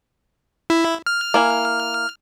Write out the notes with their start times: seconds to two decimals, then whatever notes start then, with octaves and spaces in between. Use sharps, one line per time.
0.70 E4
1.06 F6
1.34 A#3 E4 G#5